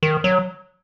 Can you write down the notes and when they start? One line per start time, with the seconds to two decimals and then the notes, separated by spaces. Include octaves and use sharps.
0.03 D#3
0.24 F#3